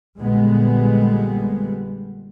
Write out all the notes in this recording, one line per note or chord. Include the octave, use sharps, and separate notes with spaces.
A#1 A#2 D3 G3 G#3 B3